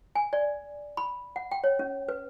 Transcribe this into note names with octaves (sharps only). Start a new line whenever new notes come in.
G#5
D5
B5
F#5
G5
C#5
C#4
B4